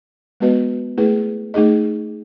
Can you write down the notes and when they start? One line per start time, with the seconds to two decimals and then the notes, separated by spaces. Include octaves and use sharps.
0.40 G#3 B3 F#4 B4 D#5
0.98 A3 E4 G#4 B4
1.54 A3 D#4 G#4 D#5